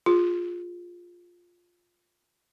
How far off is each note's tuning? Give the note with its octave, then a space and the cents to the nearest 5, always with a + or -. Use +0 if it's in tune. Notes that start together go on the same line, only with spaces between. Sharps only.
F4 +10 G#4 -15